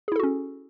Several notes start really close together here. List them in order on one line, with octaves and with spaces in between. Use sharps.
G#4 E4 A4 F#4 C#4